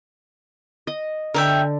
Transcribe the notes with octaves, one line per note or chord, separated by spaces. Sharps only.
D#5
D3 A#4 E5 G5